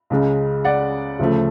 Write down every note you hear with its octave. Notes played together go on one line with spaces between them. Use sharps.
C#2 C#3 G#3
D5 F#5
D2 C#3 F3 A3